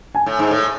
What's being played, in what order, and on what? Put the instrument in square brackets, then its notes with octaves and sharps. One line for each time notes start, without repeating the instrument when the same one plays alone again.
[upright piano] G#5
[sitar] A2
G#2
A2